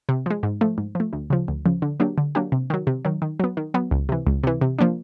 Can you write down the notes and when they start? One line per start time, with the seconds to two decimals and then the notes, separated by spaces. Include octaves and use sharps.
0.09 C3
0.26 F3 G#3
0.43 G#2
0.61 F3 A3
0.78 G#2
0.95 F3 A3
1.13 D2
1.30 C#3 F3
1.48 D2
1.66 C#3 F3
1.82 D3
2.00 F#3 A#3 D4 G4
2.18 D3
2.35 F#3 A#3 D4 G4
2.52 C3
2.70 D#3 F#3
2.87 C3
3.05 D#3 F#3
3.22 D#3
3.40 F#3 B3
3.57 D#3
3.74 F#3 B3
3.91 C#2
4.09 C3 E3
4.27 C#2
4.43 C3 E3
4.61 C3
4.79 F3 A#3 D4